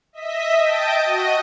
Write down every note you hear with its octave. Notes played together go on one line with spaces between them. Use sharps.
D#5 E5 B6
D#5 G5 A5 G6 D7
F#4 D#5